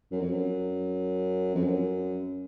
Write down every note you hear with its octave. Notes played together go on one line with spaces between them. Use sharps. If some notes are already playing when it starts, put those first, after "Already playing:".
F#2
F2
F#2
F2
F#2